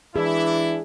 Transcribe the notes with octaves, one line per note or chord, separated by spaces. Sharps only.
E3 D4 E4 G#4